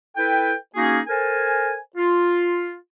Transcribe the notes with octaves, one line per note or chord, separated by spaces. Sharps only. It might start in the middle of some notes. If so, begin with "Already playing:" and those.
E4 A4 B4 G5
A#3 C#4 D#4 F#4 G#4
A4 A#4 C5 G#5
F4